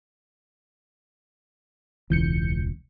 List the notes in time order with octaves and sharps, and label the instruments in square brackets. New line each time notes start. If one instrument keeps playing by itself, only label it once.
[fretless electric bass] E1 C#2 [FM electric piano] E3 G6 C#7